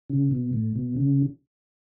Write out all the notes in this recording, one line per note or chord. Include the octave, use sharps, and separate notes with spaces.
C#3
B2
A2
B2
C#3